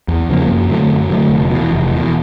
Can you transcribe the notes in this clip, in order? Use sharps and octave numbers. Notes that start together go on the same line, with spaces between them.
E2
C#3 F3 A#3
F#2
D3 F#3 A3
F#2
D3 F#3 A3
F1
E2 B2
F1
E2 B2